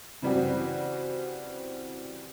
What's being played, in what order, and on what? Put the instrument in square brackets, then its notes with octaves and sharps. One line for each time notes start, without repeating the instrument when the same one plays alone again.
[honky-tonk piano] C#3 E3 G3 C4 F#4